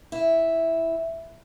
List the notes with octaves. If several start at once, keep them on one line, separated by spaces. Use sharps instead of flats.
E4